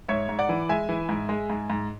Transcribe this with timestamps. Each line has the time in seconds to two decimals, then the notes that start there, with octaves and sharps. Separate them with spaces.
0.08 G#2 C#5 E5
0.29 G#2
0.39 D5 F#5
0.49 E3
0.69 G#3 E5 G#5
0.89 E3
1.09 G#2
1.29 G#3
1.50 G#2
1.70 G#2